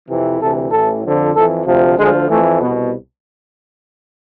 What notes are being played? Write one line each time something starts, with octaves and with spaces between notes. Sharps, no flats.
F2 C3 E3
D2 C3 E3 A4
A1 A2 E3 A4
F2 D3 F3
F2 E3 A4
D2 C3 F3
D2 D3 F3 G#3
F2 E3 A3
C2 B2 B3